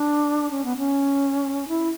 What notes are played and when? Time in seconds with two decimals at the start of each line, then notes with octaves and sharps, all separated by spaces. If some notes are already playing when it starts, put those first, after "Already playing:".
Already playing: D4
0.51 C#4
0.65 B3
0.77 C#4
1.68 E4